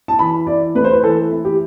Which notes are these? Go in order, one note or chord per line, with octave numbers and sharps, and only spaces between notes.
A5
E3 B5
E4 D5
A3 B4
C5
B4
E3 A4
E4
G4